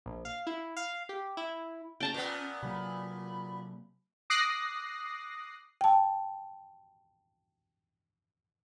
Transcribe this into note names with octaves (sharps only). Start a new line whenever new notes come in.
A#1
F5
E4
F5
G4
E4
C#4 G5 A5 A#5
A#2 B3
C3 F#3 A#3 B5
D6 D#6 F#6 A#6 C7
G5 A5